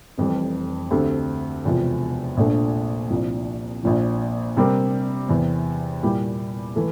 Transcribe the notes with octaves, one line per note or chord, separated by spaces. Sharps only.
F1 F2 E3 G3
D2 D3 A3 C4 G4
E1 E2 C3 F3
A#1 A#2 A3 D4
C2 A#2 F3
A#1 A#2 F3
C3 G3 C4 G4 A#4
E2 C3 E3
A#2 G3 A#3 E4 G4
E3 A3